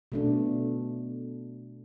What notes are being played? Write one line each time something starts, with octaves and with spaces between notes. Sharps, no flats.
B2 A3 D4